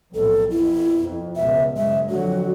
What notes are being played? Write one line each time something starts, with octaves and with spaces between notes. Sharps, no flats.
B1 F2 A2 A4
F2 B2 E4
F2
C#2 B2 E5
F#1 G#3 E5
F2 D3 F#3 F#4